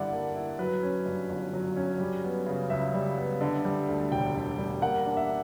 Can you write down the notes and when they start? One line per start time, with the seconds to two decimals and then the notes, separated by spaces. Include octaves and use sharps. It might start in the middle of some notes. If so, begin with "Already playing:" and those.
Already playing: G2 D3 E4 D5 F#5
0.13 A#3
0.35 E4
0.59 F#3 B4
0.83 C#4
1.06 G2
1.29 G1
1.53 F#3
1.77 C#4
2.00 G3
2.24 B3
2.47 C#3
2.70 C#2 E5
2.94 G3
3.17 B3
3.41 D3
3.65 G3
3.89 D2
4.12 E1 G5
4.36 D3
4.58 G3
4.82 A#3 F#5
5.06 D4
5.17 E5